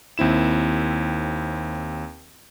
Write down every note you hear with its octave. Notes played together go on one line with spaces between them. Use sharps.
D#2 C4 E4 E7